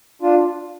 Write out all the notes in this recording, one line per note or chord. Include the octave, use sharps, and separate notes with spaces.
D4 F4